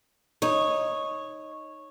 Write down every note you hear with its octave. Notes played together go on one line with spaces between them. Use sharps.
D#4 C#5